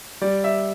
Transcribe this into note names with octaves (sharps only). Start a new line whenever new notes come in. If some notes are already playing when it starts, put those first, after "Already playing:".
G3 D5
E5